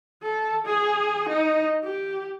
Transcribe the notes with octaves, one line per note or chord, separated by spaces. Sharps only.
A4
G#4
D#4
G4